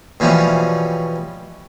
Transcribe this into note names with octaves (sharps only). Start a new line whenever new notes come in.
B2 E3 F3 G3 C#4